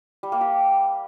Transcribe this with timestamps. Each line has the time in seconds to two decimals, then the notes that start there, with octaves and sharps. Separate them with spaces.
0.23 G3
0.32 A#3
0.41 G4